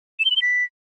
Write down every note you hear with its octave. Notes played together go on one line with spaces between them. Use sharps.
E7
G7
F#7
G7
B6